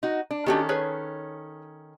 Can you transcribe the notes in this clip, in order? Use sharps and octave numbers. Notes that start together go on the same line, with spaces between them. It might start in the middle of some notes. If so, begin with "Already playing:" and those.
D#4 F#4
D4
D#3 C#4 D4 F#4 G4 A4
G#4 B4 C#5